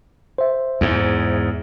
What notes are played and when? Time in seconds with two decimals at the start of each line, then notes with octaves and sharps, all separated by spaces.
0.38 C5 E5
0.81 E2 G#2